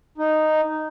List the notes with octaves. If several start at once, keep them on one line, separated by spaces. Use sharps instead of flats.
D#4